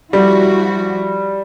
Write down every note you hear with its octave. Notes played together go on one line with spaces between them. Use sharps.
F3 G3 E4 F#4